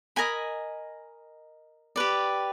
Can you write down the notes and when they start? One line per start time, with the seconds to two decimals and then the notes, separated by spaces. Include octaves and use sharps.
0.16 A#4 D#5 G#5 B5
1.96 G4 B4 D5